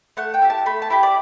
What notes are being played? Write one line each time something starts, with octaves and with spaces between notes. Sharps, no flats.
A3 F#5
G5
E4 G4
A5
A3 B5
A5
E4 G4 B5
D5